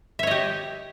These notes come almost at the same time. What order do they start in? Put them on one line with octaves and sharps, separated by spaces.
E5 C#5 D#5 G4